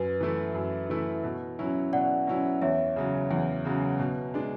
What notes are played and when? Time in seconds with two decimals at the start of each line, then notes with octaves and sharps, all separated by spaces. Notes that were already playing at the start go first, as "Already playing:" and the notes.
Already playing: F#2 B4
0.21 E3 A3 E4
0.54 F#2
0.90 E3 A3 E4
1.23 B2
1.59 F#3 C#4 E4
1.93 B2 D5 F#5
2.27 F#3 C#4 E4
2.62 E2 C#5 E5
2.96 C#3 F#3
3.31 E2
3.65 C#3 F#3
3.99 B2
4.34 G#3 D4